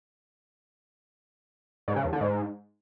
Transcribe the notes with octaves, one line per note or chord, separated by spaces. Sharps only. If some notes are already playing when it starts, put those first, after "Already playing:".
G#2
C#3
E2
D3
G#2